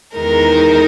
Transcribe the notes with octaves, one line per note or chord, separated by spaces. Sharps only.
E2 D#3 G#3 D#4 A#4